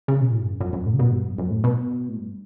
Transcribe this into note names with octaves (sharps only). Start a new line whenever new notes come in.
C#3
B2
A2
G2
F#2
F#2
F#2
A2
C#3
B2
G2
F#2
F#2
A2
B2
A2
G2